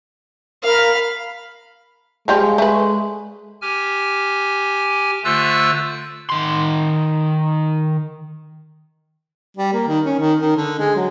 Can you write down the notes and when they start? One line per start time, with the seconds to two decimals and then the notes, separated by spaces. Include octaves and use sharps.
0.64 A#4 F5 B5
2.28 F3 G3 G#3 F4
2.58 A3 B4
3.62 G4 G#5 F6
5.24 D3 A3 F4 C5 E6 F#6
6.30 D#3 C6
9.57 G3
9.73 A#3
9.87 D#3
10.05 C#4
10.19 D#3
10.39 D#3
10.56 D3
10.79 G#3
10.95 F#3